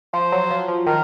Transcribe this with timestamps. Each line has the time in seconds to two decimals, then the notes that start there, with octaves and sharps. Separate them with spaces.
0.14 F3 C5
0.32 F#3
0.51 F3
0.68 F3
0.87 D#3 A#4